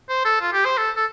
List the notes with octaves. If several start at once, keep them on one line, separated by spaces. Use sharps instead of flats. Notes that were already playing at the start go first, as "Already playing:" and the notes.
C5
A4
F4
G4
C5
A4
A4